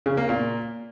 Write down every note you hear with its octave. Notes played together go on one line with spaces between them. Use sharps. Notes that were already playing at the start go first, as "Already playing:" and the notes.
C#3
A#3
A#2